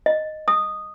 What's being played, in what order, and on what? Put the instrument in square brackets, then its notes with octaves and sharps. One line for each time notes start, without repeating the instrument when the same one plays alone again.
[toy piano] D#5
D#6